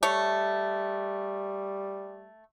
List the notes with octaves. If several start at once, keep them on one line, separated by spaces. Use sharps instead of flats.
G3 A3 C#5